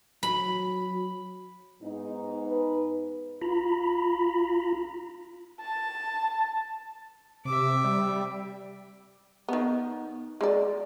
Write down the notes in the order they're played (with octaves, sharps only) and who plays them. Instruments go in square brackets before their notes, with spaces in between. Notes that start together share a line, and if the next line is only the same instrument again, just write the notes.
[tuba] F#3 [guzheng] B5
[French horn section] G#2 B3 D#4
[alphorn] B4
[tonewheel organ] F4 A#5 B5
[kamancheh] A5
[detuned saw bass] C3 [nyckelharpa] E5 D6
[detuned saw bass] G3
[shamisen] D#3 B3
G#3 D5